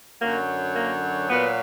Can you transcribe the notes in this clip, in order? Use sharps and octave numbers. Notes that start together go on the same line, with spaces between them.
F#2 D3 F#3 A#3
A#3
A#2 F#3 B3